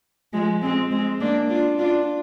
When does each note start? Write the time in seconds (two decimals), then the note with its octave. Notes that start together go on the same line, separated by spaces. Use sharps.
0.33 F3 G#3
0.62 G#3 C4
0.91 G#3 C4
1.20 A#3 D4
1.49 D4 F4
1.79 D4 F4